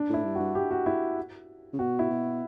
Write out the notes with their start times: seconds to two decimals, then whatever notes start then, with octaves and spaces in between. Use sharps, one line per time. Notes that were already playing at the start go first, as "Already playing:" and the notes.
Already playing: D4
0.10 A2 E4
0.24 G2
0.35 G2 F#4
0.55 G4
0.71 F#4
0.86 E4
1.73 C#3
1.79 B2 F#4
1.99 E4
2.10 B2